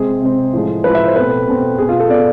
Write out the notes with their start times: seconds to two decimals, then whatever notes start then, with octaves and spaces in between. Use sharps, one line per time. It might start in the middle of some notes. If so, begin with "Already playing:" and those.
Already playing: C3 G#3 C4 G#4
0.21 C3 G#3 C4
0.53 A2 F3 G#3
0.84 A2 F3 G#3 B4
0.95 E5
1.05 C5
1.16 B2 A3 C4 B4
1.47 B2 A3 C4
1.78 B2 B3 G#4
1.89 F4
2.00 A4
2.10 B2 B3 D5